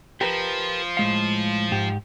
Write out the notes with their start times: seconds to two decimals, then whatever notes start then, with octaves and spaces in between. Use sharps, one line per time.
0.21 F3 G4 A#4 B4
0.97 A2 G#3 F5
1.71 G#2 G4